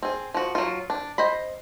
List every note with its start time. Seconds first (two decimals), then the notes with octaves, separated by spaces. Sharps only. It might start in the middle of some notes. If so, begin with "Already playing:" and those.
0.03 C4 G#4
0.34 F3 F#4
0.55 F#3 F4
0.90 D4
1.18 C5 D#5 B5